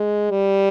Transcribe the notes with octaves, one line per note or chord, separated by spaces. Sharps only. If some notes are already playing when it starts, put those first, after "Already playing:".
Already playing: G#3
G3